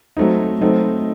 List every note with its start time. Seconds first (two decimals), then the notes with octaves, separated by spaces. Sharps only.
0.17 F#3 A3 C4 D#4
0.61 F#3 A3 C4 D#4